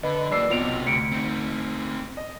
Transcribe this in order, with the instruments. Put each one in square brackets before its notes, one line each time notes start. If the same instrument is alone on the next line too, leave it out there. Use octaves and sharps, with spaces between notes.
[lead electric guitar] D3 [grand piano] B4 [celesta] D#5
[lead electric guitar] F#3 A#3 [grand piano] D5 E6 C7
[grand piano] B1 D7 [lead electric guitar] C3 F#4 [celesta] F4 F7
[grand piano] D2 [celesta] B6 C#7 D7
[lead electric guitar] C4 D#4
[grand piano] D#5